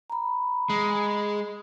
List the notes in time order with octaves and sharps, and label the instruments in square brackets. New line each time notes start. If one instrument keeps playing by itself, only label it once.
[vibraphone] A#5 B5
[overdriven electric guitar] G#3